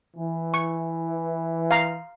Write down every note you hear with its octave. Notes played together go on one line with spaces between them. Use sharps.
E3
C#6
F5 A#5